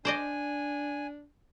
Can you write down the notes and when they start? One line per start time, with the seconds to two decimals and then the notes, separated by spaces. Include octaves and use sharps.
0.05 D4 C5 D5 D#5 G#5